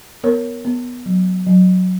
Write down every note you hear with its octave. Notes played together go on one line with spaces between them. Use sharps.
B3 A#4 C#5
B3
F#3
F#3